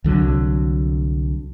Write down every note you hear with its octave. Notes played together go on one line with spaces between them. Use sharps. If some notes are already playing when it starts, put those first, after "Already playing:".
C2 D3 F#3